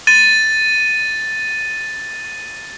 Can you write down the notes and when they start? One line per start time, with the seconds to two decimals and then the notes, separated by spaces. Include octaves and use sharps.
0.07 A6 D#7